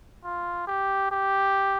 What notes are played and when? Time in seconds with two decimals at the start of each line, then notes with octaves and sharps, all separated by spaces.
0.24 F4
0.67 G4
1.11 G4